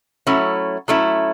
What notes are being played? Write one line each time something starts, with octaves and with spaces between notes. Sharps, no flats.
F#3 A3 C#4 E4
F#3 A3 C#4 E4